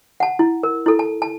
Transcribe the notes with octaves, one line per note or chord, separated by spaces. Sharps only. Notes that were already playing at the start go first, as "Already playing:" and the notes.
F#5 A5
E4
A#4
E4 A4
A5
A5